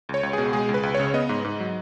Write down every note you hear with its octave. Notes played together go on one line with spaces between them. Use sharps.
C#2
C#5
C#2
B2 G#4
G#3 G#4
C#2
B4
C#2
C#5
C#3
B3 D#5
G#2
G#2
F#3